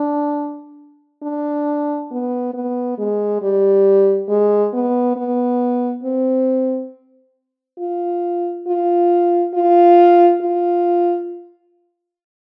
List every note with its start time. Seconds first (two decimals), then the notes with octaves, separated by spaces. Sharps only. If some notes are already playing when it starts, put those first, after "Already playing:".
Already playing: D4
1.22 D4
2.11 B3
2.54 B3
2.98 G#3
3.42 G3
4.29 G#3
4.73 B3
5.16 B3
6.04 C4
7.79 F4
8.67 F4
9.54 F4
10.41 F4